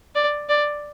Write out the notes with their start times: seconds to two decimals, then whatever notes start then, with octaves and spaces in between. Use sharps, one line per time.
0.15 D5
0.49 D5